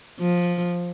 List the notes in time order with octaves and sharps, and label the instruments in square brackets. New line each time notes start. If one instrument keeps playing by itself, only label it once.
[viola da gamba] F3